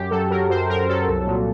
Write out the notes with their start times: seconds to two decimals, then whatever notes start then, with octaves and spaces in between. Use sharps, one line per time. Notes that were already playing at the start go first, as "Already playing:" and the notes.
Already playing: F#2 G4
0.11 F#3 A4
0.30 F#3 A#4
0.49 F#2 C5
0.69 F#2 A#4
0.89 F#3 A4
1.08 C2
1.27 A#2